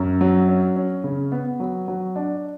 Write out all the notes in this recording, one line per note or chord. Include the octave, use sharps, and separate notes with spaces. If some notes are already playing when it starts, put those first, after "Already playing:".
Already playing: F#2
F#3
C#4
C#4
C#3
B3
F#3
F#3
D4